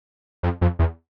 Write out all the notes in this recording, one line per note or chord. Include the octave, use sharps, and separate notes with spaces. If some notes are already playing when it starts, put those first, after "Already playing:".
F2
F2
E2